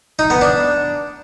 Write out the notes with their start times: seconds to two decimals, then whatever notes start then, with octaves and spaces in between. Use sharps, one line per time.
0.19 D#4
0.30 B3
0.41 D4